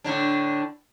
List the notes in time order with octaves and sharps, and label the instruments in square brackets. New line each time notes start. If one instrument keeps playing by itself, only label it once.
[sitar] A2 D3 D4